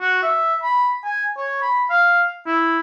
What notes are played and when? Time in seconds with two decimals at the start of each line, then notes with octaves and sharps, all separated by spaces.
0.01 F#4
0.23 E5
0.63 B5
1.04 G#5
1.37 C#5
1.62 B5
1.90 F5
2.47 E4